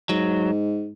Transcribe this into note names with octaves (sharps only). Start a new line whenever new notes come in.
G#2 F#3